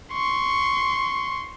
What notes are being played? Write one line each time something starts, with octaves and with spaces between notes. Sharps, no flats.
C6 C#6